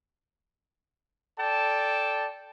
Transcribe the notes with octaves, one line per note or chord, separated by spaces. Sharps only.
A4 D5 G5 A5